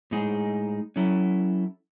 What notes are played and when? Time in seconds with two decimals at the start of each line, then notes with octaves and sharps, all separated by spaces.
0.11 A2 G#3 D#4 G#4
0.96 F#3 C#4 E4 A4